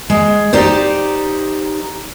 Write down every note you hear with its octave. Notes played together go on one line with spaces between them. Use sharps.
G#3
D#4 G4 C5 D5